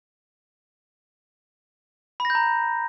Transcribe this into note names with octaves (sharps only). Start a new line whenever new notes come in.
B5
A#6
G6
A#5